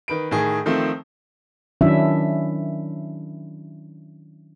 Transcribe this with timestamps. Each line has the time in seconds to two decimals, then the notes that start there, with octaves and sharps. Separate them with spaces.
0.08 D#3 B4 D7
0.31 A2 D#3 G#4
0.66 D#3 F3 A3 C4
1.81 D#3 F#3 C#4 D4 E4 E5